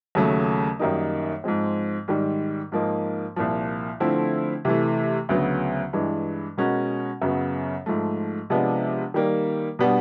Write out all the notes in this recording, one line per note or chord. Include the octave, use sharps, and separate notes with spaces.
D#2 C#3 F#3 A3
F#2 D#3 G3 A#3 D#4
G#2 F3 G#3 C4
G#2 D#3 G3
G#2 F3 A#3 D#4
C2 A#2 F3
D3 F3 A3 C4 E4
C3 E3 A3
D2 C#3 F#3 B3
G2 E3 G#3
B2 G#3 C#4 F#4 A#4
F#2 C#3 F#3 B3
G#2 F3 A3
C3 F3 G#3 B3 D4
D#3 G3 A#3
B2 G3 B3 D4